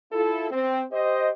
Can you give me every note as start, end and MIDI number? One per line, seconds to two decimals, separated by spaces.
0.13 0.51 64
0.13 0.51 65
0.13 0.51 69
0.51 0.83 60
0.92 1.30 67
0.92 1.30 72
0.92 1.30 75